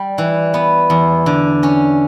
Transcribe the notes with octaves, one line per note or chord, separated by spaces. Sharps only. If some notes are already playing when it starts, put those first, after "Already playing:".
Already playing: G3
E3
B3
E2
D3
C#4